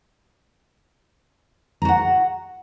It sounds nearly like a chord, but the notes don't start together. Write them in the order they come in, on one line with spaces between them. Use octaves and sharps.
A#5 F#4 F#5